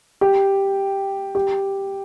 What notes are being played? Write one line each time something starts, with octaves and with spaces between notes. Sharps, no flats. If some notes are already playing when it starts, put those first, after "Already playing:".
G4
G4